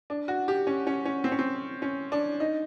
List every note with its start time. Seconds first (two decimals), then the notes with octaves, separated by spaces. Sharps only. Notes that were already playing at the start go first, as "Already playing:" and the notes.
0.10 D4
0.28 F#4
0.48 G4
0.67 C#4
0.87 C#4
1.05 C#4
1.24 C4
1.32 C#4
1.39 C4
1.82 C#4
2.12 D4
2.40 D#4